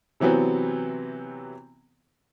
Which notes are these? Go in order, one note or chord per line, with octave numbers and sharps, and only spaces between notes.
C3 E3 F#3 B3 C4